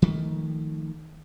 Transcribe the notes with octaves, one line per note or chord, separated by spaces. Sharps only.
D#3 F3 A3